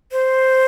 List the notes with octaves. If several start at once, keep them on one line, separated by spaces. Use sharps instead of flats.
C5